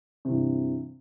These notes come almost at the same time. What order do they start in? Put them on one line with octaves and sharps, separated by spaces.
C3 E3 G2